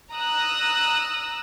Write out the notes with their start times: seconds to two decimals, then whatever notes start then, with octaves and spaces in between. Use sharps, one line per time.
0.12 A#5 D#6 E6 F#6